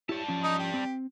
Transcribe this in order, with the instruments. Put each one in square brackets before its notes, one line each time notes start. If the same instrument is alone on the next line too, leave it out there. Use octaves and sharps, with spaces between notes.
[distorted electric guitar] G3 A5 [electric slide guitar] E4 G4 C#5
[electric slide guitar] F3 C#4
[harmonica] D#4 D#5
G4
[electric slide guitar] C4